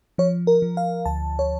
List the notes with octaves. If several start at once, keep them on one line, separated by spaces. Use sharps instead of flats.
F3 C#5
A#4
F3
F5
D2 A5
C#5